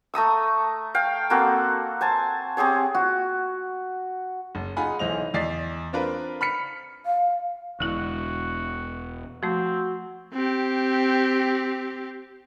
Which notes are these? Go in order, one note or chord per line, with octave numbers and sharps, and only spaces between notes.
A3 A#5 D#6 E6
F5 G5
A#3 C4 F#4 A4
C5 G#5 A5
C4 G4 G#4 C#5
F#4
F#1
D#4 F4 G#4 F#5 G#5 B5
B1 E3 C5 D#5 F7
E2 D5 D#5 A6 B6 C7
C4 D4 F4 A#4 B4
B5 F6 B6 C#7
F5
E1 D3 E4 F#4
F3 A3 C4 F#4
C4 G4